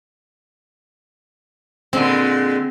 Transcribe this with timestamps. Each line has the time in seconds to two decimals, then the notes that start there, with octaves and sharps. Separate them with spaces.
1.93 A#2 D3 G#3 C4